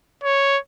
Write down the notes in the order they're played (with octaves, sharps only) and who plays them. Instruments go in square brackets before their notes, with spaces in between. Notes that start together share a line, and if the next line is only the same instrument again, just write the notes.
[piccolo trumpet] C#5